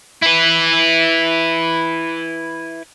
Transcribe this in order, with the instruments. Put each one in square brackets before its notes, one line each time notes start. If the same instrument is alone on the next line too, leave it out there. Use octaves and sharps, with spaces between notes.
[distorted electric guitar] E4 B4